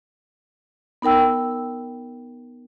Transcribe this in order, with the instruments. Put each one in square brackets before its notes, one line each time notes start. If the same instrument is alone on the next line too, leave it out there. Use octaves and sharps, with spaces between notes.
[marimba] B3 D#4 A#4 G5 E6